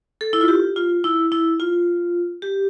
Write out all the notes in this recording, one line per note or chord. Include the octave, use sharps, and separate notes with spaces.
A4
E4
F4
G4
F4
E4
E4
F4
G4